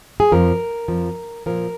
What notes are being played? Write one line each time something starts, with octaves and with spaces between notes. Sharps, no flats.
G#4
F2 F3 A#4
F2 F3
A#2 F3 A#4